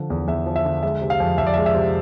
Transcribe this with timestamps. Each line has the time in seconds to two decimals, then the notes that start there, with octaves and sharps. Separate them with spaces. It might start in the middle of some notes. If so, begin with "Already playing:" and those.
Already playing: D3 F3
0.10 E2
0.27 E2 E5
0.46 F3
0.56 E5
0.65 D3
0.83 G#3 E5
1.01 C3
1.10 F5
1.20 F2
1.38 F2 E5
1.47 D5
1.54 G#3 E5
1.66 E5
1.74 C3